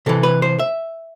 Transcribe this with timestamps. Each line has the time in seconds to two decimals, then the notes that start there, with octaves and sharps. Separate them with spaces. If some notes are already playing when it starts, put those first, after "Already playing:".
0.06 C3 E3 A4
0.23 B4
0.42 C5
0.59 E5